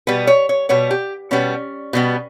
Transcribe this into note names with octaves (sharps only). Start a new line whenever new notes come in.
B2 G3 B3 B4
C#5
C#5
B2 G3 B3 C#5
G4
B2 G3 B3 C#4
B2 G3 B3